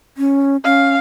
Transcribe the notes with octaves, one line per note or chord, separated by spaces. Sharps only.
C#4
C#4 F5